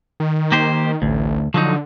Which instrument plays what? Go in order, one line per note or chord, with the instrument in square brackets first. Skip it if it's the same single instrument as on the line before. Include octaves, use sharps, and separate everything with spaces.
[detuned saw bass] D#3
[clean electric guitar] A#3 G4 C5
[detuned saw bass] A1 [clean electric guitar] D2
[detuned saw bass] D3 [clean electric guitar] F3 F#3 D#4